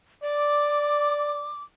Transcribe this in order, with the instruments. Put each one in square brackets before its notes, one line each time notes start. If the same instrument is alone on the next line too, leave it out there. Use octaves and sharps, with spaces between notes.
[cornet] D5 [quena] D6